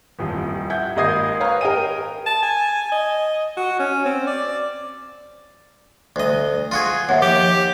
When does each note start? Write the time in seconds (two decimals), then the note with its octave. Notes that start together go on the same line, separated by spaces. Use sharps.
0.19 D#1 A1 F2
0.70 E5 F#5 G6 G#6
0.96 G#1 A#3 D#5 D#6 G#6 C7
1.40 B4 C#5 F5 A#5
1.61 A#4 D#5 G5 D#7
2.27 A5
2.43 G#5
2.92 D#5
3.57 F#4
3.79 C#4
4.05 C4
4.27 D5
6.16 D2 D#5
6.71 F4 F#4 G#4
7.09 D#2 E5 F#5
7.22 F3 G4